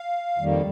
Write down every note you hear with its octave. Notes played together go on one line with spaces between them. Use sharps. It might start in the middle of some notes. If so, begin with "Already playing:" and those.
Already playing: F5
F2 D#3 G3 A#3